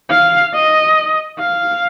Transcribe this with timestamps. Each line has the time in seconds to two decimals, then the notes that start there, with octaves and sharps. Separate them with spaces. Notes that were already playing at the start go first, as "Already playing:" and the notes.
0.10 F5
0.54 D#5
1.40 F5